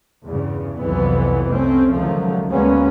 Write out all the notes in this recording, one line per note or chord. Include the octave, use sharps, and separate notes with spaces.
E2 G2 C#3
C2 F2 C3 E3 F#3 B3
C2 A3 C4 C#4
C#2 D3 D#3 F3 F#3 A3
D2 G3 G#3 A#3 B3 C#4